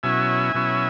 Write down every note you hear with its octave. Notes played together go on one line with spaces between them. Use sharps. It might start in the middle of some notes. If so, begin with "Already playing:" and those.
B2 F#3 C#4 E4 E5 G#5
B2 F#3 C#4 E4